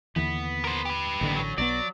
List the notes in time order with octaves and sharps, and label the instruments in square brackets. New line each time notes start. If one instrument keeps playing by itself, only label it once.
[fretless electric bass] D#2 D3 E3 [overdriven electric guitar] B3
[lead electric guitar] A#4 C5
G4 B4
[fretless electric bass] A1 D3 [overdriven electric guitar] D#2 B3
[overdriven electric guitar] F#3 C#4
[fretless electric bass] B1 G3 B3 [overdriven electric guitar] F#3 [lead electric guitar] D5